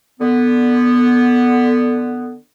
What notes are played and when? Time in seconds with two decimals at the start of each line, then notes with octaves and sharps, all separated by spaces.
0.20 D3 B3